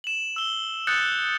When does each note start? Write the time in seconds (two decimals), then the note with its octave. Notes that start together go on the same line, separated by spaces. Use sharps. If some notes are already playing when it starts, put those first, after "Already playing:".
0.04 E7 F#7
0.36 E6 G7
0.87 D#6 F#6 G6 A6 C#7